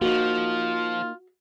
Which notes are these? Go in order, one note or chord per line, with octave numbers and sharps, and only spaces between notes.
F3 A#3 D#4 F4 F#4